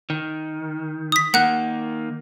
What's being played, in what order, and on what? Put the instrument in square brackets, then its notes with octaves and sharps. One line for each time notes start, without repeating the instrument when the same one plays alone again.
[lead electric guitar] D#3
[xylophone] D#6 B6
[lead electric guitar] D#3 A#3 [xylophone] F#5 F#6